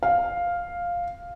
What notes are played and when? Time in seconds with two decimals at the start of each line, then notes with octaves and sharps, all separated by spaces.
0.03 F5